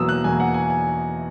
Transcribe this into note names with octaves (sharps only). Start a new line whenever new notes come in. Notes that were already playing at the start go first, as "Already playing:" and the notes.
Already playing: E2 B2 F#3 A#3 D#6 E6
F#6
E2 B2 F#3 A#3 G#5
F#5
G#5
G#5